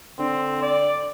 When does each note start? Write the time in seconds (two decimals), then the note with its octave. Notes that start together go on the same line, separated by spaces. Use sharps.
0.19 D3 C4
0.62 D5